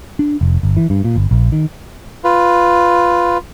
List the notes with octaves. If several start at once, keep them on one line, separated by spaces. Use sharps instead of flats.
D4
F1
G1
E3
G2
A#2
G1
A#1
D#3
F4 B4